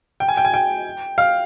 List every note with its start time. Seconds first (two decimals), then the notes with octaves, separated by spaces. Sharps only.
0.20 G5
0.28 G#5
0.37 G5
0.45 G#5
0.54 G5
1.18 F5